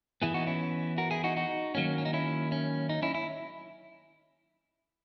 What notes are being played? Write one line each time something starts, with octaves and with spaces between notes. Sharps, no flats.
E3 B3 E4 G#4
D#4 F#4
C#4 E4
F#4 A#4
E4 G#4
D#4 F#4
D#4 F#4
D#3 F#3 A#3 C#4
C#4
D#4
C#4 E4
C#4
D#4
C#4 E4
E4